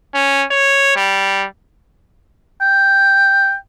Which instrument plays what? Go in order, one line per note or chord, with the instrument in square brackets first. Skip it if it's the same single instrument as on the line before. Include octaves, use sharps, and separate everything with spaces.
[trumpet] C#4
C#5
G3
[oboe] G5